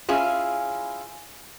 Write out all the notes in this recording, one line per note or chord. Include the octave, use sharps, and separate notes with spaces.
C#4 E4 F4 G#4